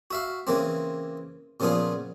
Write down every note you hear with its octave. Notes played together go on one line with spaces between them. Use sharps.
F#4 E5 F5
C#3 E3 A#3 C4
A#2 C#3 F3 B3 F4 G#4